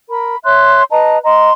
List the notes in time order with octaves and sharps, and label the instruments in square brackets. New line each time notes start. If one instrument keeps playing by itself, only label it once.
[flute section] A#4 B5
C#5 E5 C6 F#6
B4 D#5 A5 A#5
D#5 A#5 C6